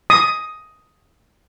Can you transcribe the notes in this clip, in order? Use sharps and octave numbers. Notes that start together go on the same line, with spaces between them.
D#6